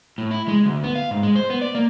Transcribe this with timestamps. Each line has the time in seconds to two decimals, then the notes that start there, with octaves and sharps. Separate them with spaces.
0.18 A2
0.31 E4
0.48 G#3
0.66 D2
0.84 B3
0.95 F5
1.11 G#2
1.23 G#3
1.36 C5
1.50 B3
1.61 D5
1.75 A#3